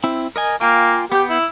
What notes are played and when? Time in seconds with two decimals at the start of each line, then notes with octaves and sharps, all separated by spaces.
0.04 C4 E4
0.36 A#4 D#5 G#5
0.61 A#3 F4 G5 G#5
1.12 B3 G4 G6
1.30 E4